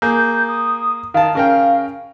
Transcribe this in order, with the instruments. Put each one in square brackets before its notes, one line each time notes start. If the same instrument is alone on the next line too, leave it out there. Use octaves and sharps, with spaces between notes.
[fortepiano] A#3 G#4 [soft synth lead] G6
[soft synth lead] D#6
[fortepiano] D#3 A5 [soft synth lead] F5
[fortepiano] C#3 A#4 G5